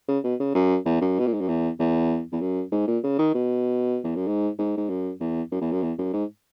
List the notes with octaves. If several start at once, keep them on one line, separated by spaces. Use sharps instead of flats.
C#3
B2
C#3
F#2
E2
F#2
B2
A#2
G#2
F#2
E2
E2
E2
F#2
G#2
A#2
C#3
D#3
B2
E2
F#2
G#2
G#2
G#2
F#2
E2
F#2
E2
F#2
E2
F#2
G#2